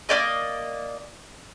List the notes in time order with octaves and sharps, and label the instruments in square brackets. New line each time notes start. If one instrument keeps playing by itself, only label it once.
[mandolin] A#3 D4 D5 D#5